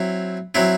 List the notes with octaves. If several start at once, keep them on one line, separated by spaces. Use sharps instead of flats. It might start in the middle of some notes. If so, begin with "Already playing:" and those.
Already playing: F#3 C4 E4
F#3 C4 E4